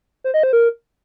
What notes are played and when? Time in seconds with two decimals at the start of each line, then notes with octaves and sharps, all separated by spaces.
0.24 C5
0.34 D#5
0.43 C5
0.53 A#4